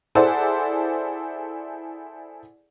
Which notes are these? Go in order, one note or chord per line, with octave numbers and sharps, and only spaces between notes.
E4 G#4 A4 C5 D5 F#5